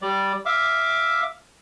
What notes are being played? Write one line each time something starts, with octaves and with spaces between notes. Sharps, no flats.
G3 D5
E5 F5 D6